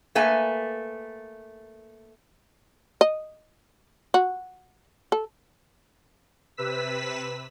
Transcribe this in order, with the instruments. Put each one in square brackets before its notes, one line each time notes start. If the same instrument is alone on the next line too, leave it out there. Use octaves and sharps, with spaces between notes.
[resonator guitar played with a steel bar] A3 A#3 B4 G#5
[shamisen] D#5
F#4
A4
[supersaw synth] C3 B4 E6 B6